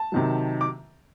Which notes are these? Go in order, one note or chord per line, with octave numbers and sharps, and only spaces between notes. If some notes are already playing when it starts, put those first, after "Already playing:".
Already playing: A5
C3 D#3 F#3
D6